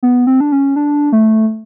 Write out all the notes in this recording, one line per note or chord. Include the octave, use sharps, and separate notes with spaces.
B3
C4
D4
C#4
D4
A3